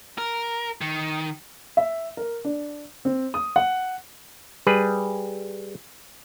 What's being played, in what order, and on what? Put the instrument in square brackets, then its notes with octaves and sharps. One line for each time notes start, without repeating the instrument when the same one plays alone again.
[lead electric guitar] A#4
D#3
[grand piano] E5
A#4
D4
C4
D#6
F#5
[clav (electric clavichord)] G3 G#4 B4